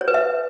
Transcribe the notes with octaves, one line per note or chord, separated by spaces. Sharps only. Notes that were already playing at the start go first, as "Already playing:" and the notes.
C#5
B4
E5